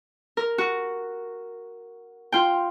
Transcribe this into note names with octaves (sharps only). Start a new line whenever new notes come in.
A#4
F#4
F4 G5